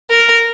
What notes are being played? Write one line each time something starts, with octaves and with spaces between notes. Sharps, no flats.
A#4